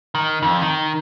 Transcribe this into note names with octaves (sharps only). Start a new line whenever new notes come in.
D#3
F2
D#3